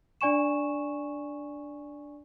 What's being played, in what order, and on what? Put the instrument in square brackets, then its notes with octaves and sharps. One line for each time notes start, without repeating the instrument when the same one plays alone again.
[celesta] D4 D5 G#5 C#6 E7